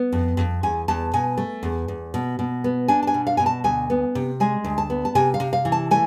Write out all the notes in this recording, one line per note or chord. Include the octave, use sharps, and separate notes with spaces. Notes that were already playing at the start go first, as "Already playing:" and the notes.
Already playing: B3
F2
F2
E2 G#5
E2 A5
B2 G#5
A3
E2
E2
B2
B2
B3
D4 G#5
A5
G#5
B2
F5
B2 G#5
A5
D2 G#5
B3
C3
G#3 G#5
D2
A5
B3
A5
C3 G#5
F5
C3
F5
E3
A5
A3 G#5